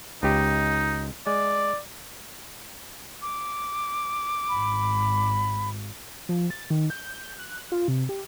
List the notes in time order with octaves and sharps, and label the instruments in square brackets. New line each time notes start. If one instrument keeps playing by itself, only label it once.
[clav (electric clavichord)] C#2 G4 [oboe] D#4
[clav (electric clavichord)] G#3 [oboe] D5
[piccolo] D6
[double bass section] G#1 [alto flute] B5
[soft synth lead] F3
A6
D#3
G6
F#6
F4
C3
G4